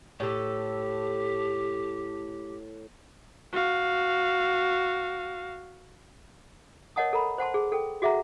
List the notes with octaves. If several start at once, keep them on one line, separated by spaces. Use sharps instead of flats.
A2 G4 A4
F#4 F5
A#4 C#5 D#5 F#5 A5 D#6
A4 A#4 A#5 B5
C5 F#5 A5 C6
G#4
A4 G5
F#4 G#4 E5 F#5 A#5